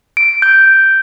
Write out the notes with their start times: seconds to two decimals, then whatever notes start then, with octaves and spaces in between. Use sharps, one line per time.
0.17 D7
0.42 G6